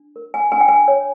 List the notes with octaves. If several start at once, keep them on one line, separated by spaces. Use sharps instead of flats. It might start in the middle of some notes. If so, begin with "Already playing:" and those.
Already playing: D4
A#4
G#5
D4 G#5
G5
G#5
C#5